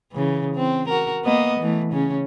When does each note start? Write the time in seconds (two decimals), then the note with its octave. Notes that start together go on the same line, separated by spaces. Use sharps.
0.12 C#3 E3
0.55 C4
0.89 F#4 A#4
1.24 A#3 B3 D#5
1.59 E3 A3
1.92 C#3 C#4